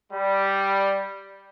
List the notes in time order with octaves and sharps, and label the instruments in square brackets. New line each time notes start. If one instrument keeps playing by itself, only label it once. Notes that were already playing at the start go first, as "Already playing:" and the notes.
[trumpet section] G3